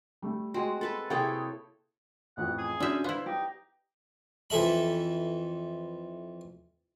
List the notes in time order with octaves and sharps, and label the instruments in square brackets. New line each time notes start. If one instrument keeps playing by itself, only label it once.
[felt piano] G3 A3
[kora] G#3 C4 [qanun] F#4
[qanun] A4 B4 A5
[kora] C3 A#3 [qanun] E4 A4 C#5 [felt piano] G#4 G5
[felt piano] A1 F2 [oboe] F#5
[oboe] G#4
[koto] D3 E5 [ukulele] C#4 F#4 [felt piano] D5 F#5 G6
[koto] B3 E4 [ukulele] C5 F5
[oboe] D#4 [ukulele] G4
[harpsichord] F2 E3 A4 E5 B5